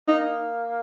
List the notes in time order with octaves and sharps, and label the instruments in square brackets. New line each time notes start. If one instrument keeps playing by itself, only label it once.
[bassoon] A#3 [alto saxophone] D#4